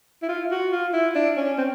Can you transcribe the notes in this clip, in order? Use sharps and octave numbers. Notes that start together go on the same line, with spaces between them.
E4
F4
F#4
F4
E4
D4
C#4
C4